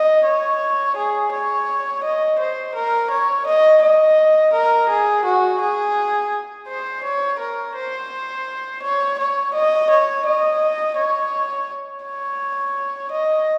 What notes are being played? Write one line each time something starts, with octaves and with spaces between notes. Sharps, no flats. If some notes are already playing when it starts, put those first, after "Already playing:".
Already playing: D#5
C#5
G#4
C#5
D#5
C5
A#4
C#5
D#5
D#5
A#4
G#4
F#4
G#4
C5
C#5
A#4
C5
C#5
C#5
D#5
C#5
D#5
C#5
C#5
D#5